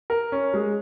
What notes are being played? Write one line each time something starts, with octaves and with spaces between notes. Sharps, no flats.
A#4
C#4
G#3